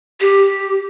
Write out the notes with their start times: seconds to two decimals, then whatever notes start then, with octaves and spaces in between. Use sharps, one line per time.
0.21 G4